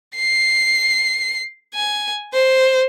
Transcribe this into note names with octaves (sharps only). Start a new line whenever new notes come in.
C7
G#5
C5